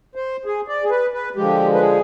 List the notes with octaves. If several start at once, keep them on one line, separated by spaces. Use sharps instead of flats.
C5
G#4
D5
G#4
B4
B4
D3 F3 G#3 G4
B4
G#4